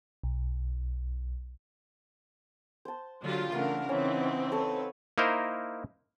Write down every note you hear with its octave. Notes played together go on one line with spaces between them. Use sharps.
B1
C5 A5
D3 F#3 F4 G4 A6
C#3 E3 A3 D4 A#4 F5 F#5
C#3 E3 C4 C#4 D#4
A4 B4 C#5
A#3 D#4 E4 A#4 C5